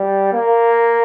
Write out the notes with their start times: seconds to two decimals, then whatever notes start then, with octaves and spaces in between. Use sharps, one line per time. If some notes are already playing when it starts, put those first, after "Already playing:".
Already playing: G3
0.33 A#3